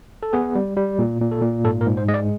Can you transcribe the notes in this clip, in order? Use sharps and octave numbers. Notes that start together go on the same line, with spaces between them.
A4
B3 G#4
G3
G3
A#2
A#2
A4
A#2
G#2 A4
A#4
G#2
C5
G#3 D#5
D5